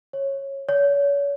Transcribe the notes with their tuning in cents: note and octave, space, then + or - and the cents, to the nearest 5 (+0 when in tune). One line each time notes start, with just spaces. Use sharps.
C#5 -15
C#5 +35